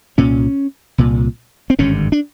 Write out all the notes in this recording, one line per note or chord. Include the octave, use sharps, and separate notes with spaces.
C2 A#2 C#4
C2 A#2
C4
G#1 G2 D3 C#4
D4